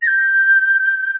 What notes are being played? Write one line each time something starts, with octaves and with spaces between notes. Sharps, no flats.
A#6
G6